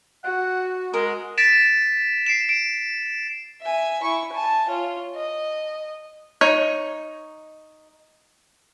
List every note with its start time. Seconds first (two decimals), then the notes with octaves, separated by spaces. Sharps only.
0.24 F#4 F#5
0.94 G#3 A#4
1.38 A6 B6 D7 E7
2.26 C7 D7 E7
2.49 D7
3.61 E5 G#5
4.02 E4 C#6
4.32 G#5 A5
4.69 F4 C#5
5.15 D#5
6.41 D#4 C#5